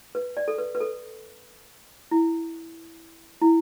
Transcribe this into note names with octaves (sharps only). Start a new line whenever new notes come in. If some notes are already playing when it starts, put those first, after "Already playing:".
B4
D5
A4
B4
B4
A4
E4
E4